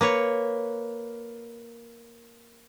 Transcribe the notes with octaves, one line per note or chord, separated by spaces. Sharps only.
A#3 B4 C#5